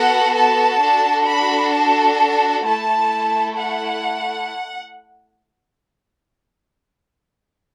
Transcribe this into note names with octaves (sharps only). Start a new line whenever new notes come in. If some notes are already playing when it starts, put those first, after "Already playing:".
Already playing: B3 F#4 A4 F#5
A5
D4 F#4 A4
B5
A5
A3 E4 A4 A5
F#5